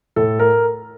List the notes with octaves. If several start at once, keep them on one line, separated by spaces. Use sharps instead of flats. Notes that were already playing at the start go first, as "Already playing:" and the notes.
A2 A4
A#4